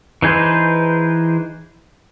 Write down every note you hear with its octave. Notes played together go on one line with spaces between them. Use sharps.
E3 D#4 G#4 B4 C5